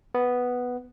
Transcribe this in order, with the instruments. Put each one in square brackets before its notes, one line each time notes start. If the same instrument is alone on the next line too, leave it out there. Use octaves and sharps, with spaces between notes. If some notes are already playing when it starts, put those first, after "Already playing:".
[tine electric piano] B3